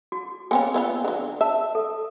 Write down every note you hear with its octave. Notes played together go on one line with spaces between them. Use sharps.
F#4
A#3 B3 C#4 G5 G#5 C6
B3 E4 F4
D3 F#3
E5 A5
A4